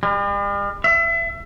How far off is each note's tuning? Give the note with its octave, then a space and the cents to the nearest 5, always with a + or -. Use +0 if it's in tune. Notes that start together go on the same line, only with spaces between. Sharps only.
G3 +45
E5 +30